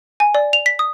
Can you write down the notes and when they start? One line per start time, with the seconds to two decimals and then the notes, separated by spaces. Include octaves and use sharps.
0.20 G#5
0.35 D5
0.53 F7
0.66 B6
0.79 D#6